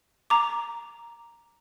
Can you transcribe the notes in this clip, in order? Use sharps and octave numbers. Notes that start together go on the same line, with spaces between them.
A#5 D6